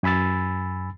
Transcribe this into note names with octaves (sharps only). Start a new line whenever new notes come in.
F#2 G#5 B5 E6 A6